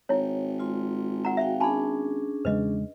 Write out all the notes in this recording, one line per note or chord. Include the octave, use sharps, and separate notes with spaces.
G#1 E4 C#5
G#3 F4 C6
F#5 A#5
F#4 E5 F5 G5
C#4 D4 G#4 G#5 A5 B5
E2 C#3 G#3 B4 D#5